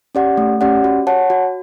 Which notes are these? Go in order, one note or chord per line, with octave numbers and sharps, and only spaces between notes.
C#4 G4 D5 F#5
A3
C#4 G4 D5 F#5
F#4
C#5 F#5 A5
F#4